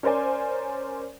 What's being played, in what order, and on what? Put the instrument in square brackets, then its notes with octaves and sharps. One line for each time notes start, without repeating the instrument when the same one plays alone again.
[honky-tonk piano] C#4 A#4 C5 D5 G#5